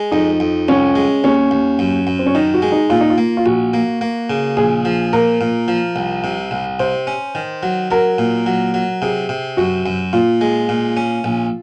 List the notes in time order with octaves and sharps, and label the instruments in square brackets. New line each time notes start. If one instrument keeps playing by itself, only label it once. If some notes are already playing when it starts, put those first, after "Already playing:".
Already playing: [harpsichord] G#3
[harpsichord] F2 [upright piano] D#4
[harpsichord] F2
[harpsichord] C2 [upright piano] C#4
[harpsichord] G#3
[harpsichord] D#2 [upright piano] C#4
[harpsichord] D#2
F#2
F#2
[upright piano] C4
C#4
[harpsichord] D#3 [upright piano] D#4
[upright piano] F#4
[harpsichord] G#3
[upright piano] D#4
[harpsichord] A#2 [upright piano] F4
[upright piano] D#4
F4
[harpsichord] A#3
[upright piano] F4
[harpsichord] A#1 [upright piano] F#4
[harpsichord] A#3
A#3
C#3
[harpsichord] A#1 [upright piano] G#4
[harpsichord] F3
[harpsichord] A#2 [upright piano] A#4
[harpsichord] A#2
F3
C2
C3
C2
[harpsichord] C3 [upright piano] C5
[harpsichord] C#4
D#3
F#3
[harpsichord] F#3 [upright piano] A#4
[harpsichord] A#2
F#3
F#3
[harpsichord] C3 [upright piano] G#4
[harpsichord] C3
[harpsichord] F#2 [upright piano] F#4
[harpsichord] F#2
[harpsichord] A#2 [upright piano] F4
[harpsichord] G#3
A#2
C#4
A#1